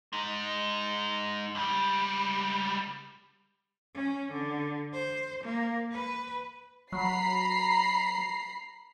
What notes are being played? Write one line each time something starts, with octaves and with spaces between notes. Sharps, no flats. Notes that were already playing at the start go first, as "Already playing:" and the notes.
G#3 D#4
C#2 G3
C#4
D3
C5
A#3
B4
F#3 A#5 B5 C7